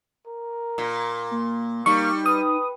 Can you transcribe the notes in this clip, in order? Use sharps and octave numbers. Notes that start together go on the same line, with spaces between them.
A#4
A#2
A#3
G3 A#3 D#4 C#6
B4 D#6